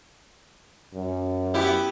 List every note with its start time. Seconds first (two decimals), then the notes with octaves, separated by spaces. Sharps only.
0.94 F#2
1.54 B3 E4 G4